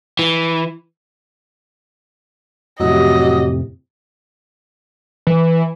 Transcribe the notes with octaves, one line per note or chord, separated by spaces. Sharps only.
E3
F2 A2 C3 F#3 G4 D#5
E3